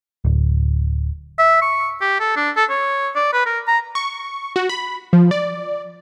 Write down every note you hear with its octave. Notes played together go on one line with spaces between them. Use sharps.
D1
E5
C#6
G4
A4
D4
A4
C#5
D5
B4
A#4
A#5
C#6
F#4
B5
F3
D5